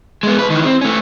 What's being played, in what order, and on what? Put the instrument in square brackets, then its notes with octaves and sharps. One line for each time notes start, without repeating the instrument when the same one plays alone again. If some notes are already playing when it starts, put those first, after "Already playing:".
[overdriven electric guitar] G#3 B3
B1 B4
D#3 E3
C4
A3 C#4